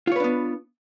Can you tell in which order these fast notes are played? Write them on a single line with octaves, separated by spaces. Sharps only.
F4 C#5 B4 D4 B3